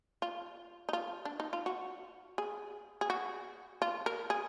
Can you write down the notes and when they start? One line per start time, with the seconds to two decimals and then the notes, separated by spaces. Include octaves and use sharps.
0.22 F4
0.89 D#4
0.93 F4
1.25 D4
1.40 D#4
1.53 F4
1.66 F#4
2.38 G#4
3.01 G#4
3.10 F#4
3.82 F4
4.06 A#4
4.30 G#4